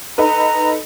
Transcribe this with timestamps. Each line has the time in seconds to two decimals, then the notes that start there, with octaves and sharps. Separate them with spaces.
0.18 D#4 A4 B4 A#5